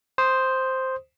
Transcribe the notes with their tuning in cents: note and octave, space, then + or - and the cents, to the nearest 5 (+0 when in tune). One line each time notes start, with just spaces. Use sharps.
C5 +0 D#6 +0